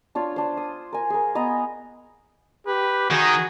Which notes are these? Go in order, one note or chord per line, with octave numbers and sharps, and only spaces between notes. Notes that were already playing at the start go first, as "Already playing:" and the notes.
D4 F4 C#5
D4 C5
D#6
A#4 G#5
G#4 A#4
B3 D#5 G#5 A#5
G4 B4
D#3 F#4 G#4